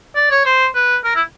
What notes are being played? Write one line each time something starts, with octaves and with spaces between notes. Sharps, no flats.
D5
C#5
C5
B4
A#4
E4